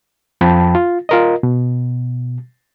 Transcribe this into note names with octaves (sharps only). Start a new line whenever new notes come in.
F2 F3 G5 A5 B5
F4
F4 A#4 D#5
B2